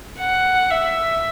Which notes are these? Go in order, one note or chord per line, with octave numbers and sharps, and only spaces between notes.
F#5
E5